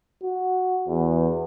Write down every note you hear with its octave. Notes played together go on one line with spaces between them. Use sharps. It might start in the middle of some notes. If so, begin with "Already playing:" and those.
F#4
E2